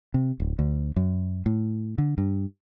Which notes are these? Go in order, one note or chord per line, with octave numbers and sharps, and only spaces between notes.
C3
D1
D2
F#2
A2
D3
G2